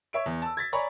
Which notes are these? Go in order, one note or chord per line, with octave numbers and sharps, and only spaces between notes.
C#5 E5 D7
E2
A5 E6
G#6 A6 B6
C#5 D5 G#5 A#5 B5 C#6